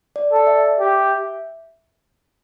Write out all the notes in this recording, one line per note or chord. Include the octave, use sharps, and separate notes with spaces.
D5
A4 D5
E5
G4